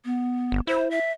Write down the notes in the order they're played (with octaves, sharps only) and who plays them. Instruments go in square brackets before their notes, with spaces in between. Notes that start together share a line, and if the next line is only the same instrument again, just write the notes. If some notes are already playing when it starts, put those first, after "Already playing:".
[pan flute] B3
[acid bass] G1
[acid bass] E4 [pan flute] C5
[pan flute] E5